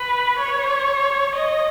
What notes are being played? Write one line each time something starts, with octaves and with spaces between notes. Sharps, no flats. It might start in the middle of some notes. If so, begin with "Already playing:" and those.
Already playing: B4
C#5
D#5